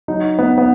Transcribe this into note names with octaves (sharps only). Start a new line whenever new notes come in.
F#3 D#4
B3
B3